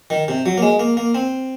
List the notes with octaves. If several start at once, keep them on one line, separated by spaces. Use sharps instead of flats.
D#3
C3
F#3
A#3
G#3
A#3
A#3
C4